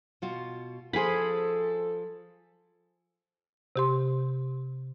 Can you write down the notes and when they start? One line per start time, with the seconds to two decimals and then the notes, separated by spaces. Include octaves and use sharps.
0.22 B2 F4 F#4
0.93 F3 G#4 A4 C5 B5
3.76 C3 G4 C6